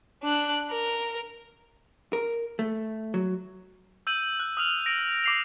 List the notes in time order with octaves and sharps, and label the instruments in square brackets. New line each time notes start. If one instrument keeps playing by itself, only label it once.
[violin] D4 F#6
A#4
[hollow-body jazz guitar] A#4
A3
F#3
[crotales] E6 G6 D#7 F#7
F#6
D#6 F6 F7
A#6 D7
D6 C7 F7